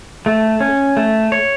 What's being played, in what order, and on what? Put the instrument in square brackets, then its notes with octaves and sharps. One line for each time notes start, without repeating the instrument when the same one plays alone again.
[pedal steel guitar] A3
C#4
A3
C#5